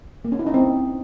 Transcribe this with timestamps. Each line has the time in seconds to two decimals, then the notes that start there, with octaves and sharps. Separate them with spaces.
0.25 A#3
0.32 C#4
0.39 E4
0.47 D#4
0.54 C4